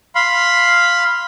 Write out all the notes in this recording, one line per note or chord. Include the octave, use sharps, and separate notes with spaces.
F5 B5 C6